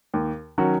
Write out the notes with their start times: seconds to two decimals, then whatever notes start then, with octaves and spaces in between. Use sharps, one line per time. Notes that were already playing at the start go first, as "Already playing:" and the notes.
0.13 D#2
0.58 D#3 F#3 C#4 F#4